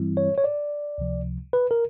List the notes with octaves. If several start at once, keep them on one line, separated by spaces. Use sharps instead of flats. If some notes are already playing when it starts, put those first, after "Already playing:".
Already playing: G2 E3 G3 C4 E4
C#5
C#5
D5
C#2 C3 F3
B4
A#4